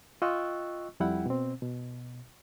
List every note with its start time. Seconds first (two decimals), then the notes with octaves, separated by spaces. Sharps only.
0.22 F4 D#5 G5 C#6 E6 F#6
1.00 F2 G3 E4 F#5 G5
1.26 B2 C4
1.62 B2